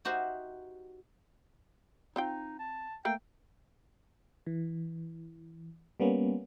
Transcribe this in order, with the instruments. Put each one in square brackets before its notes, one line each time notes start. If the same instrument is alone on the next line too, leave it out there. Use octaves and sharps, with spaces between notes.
[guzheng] D#4 F#4 G4 C5 E5
[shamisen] C4 F4 G5 [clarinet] D#4
[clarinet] A5
[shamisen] A3 A#3 [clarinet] G5
[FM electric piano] E3
G3 A#3 B3 C#4